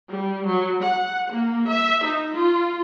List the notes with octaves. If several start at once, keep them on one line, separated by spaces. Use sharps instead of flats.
G3
F#3
F#5
A#3
E5
D#4
F4